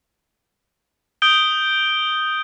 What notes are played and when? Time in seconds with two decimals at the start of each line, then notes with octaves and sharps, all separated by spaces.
1.22 D#6 G6 D7 G7